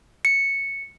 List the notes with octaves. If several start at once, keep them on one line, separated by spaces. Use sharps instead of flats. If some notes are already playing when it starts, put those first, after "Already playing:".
C#7